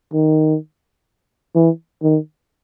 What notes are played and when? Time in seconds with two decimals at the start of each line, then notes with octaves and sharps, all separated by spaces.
0.13 D#3
1.55 E3
2.03 D#3